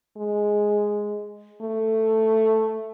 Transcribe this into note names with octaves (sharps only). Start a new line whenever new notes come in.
G#3
A3